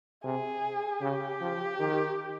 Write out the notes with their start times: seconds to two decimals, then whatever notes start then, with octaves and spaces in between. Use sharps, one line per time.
0.24 C3 G#4
1.01 C#3 G4
1.41 F3
1.79 D#3